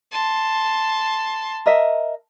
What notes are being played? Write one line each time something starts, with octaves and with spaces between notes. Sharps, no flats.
A5 C6
A#4 D#5 E5